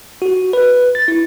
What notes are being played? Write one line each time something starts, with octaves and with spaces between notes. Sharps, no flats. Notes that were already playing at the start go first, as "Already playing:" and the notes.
F#4
B4
A6
E4